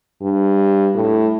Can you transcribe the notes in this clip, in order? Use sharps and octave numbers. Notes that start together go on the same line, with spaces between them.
G2
A2